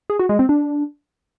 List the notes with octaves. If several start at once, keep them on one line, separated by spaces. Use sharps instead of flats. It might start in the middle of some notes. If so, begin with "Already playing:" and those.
G#4
F#4
G#3
C4
D4